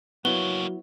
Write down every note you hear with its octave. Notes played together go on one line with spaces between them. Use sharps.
F#3 A#3 B3 E4 F#4 C#5 G7